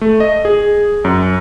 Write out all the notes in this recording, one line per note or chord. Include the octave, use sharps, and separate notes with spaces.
A3
D#5
G#4
F#2